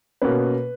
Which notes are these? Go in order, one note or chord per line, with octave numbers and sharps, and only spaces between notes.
B2 A#3 C#4 B4